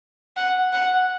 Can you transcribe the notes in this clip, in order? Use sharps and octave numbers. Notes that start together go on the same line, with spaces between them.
F#5
F#5